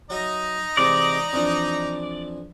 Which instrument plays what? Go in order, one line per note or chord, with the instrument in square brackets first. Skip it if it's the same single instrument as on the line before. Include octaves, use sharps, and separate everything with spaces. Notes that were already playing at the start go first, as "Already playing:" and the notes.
[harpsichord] F#3 E5 [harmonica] D#4 D#5
[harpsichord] C3 E3 G#3 [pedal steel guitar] D5
[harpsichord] F2 E3 D4